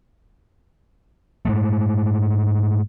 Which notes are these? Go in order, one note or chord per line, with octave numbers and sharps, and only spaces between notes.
G#2 G#3 A3